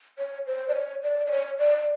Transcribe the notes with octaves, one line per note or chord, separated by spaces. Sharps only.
C#5
C5
D5
C#5
D5
D5
C#5
D5